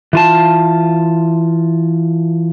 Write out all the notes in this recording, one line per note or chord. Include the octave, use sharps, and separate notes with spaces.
E3 F4 A5